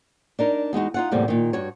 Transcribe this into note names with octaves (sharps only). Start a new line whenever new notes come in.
D4 D#4 A#4
E2 G#3 D#4 F#4
D#4 F4 F#5
E2 A2 C3 G3 A#3
A#2 D#3
G2 F#4 C#5